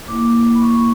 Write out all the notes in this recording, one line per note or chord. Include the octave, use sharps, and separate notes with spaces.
A#3 E4 D6
B5
C#6